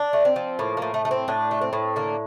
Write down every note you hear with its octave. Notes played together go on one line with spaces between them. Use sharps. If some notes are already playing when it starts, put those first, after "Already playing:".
Already playing: D4
A3
C4
F3
A2 A#3
A2 A#3
A3
A3
C4
A2 D4
A3
C4
A2
D3 A#3